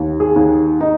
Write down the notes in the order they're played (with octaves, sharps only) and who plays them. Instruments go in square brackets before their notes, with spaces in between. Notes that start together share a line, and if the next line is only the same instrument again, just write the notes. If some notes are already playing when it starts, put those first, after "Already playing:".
Already playing: [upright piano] D#2
[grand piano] G#4
[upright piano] D#2
[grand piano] D#4